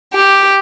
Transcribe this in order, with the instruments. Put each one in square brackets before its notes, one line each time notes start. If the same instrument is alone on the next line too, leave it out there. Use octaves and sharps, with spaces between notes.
[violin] G4